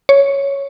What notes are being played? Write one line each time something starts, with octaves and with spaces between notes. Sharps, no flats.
C#5